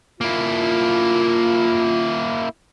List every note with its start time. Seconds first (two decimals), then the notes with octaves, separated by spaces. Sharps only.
0.21 A#3 E4 F4